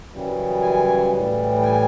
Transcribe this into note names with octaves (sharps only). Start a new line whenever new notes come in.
F#2 C#3 E3 G3
G#5
A2 E3 G3
G5
G#5